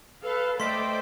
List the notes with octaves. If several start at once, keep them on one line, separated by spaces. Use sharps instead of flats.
A4 B4 F5
A3 C5 D5 D#5 G5 C6 B6